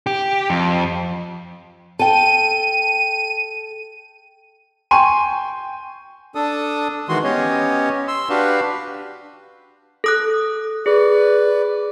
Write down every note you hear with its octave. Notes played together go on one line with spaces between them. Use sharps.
G4
F2
A4 G5 D#7
G5 G#5 C6 C#6 D#7
D4 A4 D#6
D#3 E3 G#3 F#4 C6
B3 C#4 G4 C#5 D#5
C6 E6
D4 F#4 G4 B4 F5
A4 D#6 F#6
G#4 B4 D5